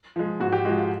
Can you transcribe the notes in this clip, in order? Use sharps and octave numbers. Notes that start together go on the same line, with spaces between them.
F3 G#3
G#2 F#4
G4
F3 G#3 F#4
F4